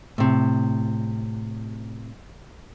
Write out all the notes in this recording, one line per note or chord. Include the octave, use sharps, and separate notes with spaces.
A2 C3